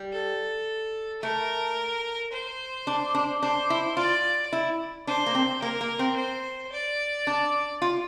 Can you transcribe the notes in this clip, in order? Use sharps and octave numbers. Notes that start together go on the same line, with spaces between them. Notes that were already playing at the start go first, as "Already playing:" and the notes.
Already playing: G3
A4
A3 A#4
C5
D4
D4
D4 C5
E4
F4 D5
E4
D4 C5
A#3
C4
A#3 A#4
A#3
C4
C5
D5
D4
F4